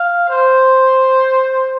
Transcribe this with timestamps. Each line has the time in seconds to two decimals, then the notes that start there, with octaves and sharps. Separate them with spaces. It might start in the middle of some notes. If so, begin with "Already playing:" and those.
Already playing: F5
0.29 C5